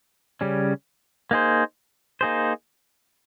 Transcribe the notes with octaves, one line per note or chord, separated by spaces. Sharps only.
C#3 G3 C#4
A#3 D#4 G#4 C5
A#3 D#4 G#4 C5